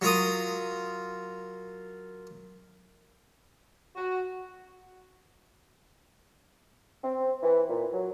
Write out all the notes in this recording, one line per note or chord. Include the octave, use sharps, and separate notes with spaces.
F#3 F4 A#4 D#6
F#4
C4
E3
A#2
F#3